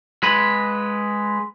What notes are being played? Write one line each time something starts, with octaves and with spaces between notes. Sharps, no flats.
G#3 B4